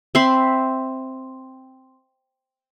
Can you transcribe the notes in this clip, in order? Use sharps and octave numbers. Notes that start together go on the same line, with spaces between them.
C4 E5 B5 C6